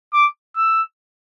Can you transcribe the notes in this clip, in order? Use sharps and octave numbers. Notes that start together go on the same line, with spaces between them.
D6
E6